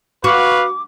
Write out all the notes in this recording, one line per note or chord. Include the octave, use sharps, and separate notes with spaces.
F#4 B4 F5 D6